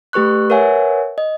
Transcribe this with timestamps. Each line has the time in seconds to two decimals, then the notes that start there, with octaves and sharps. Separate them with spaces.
0.13 A3 G4 B4 C#6 F#6
0.50 A#4 B4 C#5 E5 F#5 G#5
1.18 D#5